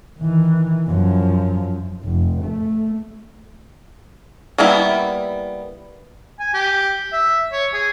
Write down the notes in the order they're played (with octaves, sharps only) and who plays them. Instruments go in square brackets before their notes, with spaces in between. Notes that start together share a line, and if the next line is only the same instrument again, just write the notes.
[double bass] D#3 E3
F#2 F3
[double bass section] F1
A3
[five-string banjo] G3 A#3 B3 E4
[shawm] G#5
G4
E5
C#5
G#4